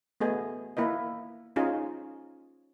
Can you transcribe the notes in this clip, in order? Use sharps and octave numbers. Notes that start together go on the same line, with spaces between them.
A3 B3 G#4 D#5
A#3 E4 B4 D#5
C#4 D#4 F4 G#4